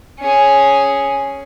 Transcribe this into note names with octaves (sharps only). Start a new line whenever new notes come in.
C#4 G#4